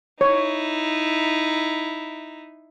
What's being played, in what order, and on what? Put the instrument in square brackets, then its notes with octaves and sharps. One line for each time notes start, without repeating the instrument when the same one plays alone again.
[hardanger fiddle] D#4 E4 [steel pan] C#5